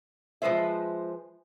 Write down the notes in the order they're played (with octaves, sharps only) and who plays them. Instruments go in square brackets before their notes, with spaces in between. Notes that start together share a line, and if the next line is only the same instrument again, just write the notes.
[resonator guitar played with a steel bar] F3 G#3 B4 C5 E5